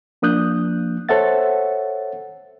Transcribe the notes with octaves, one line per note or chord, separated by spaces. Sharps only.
F3 A#3 D4 D#6 F#6 G6
A4 C5 C#5 E5 F#5 A6